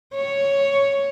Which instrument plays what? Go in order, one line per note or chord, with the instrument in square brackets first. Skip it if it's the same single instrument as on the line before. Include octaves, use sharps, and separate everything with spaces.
[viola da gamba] C#5